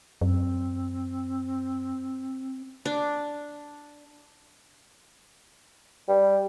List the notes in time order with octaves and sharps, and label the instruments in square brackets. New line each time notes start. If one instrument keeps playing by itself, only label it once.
[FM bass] F#2 [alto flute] C4
[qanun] D4
[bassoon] G3